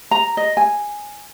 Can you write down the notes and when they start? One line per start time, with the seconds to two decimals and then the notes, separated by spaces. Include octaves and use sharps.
0.11 A#5
0.37 D#5
0.57 G#5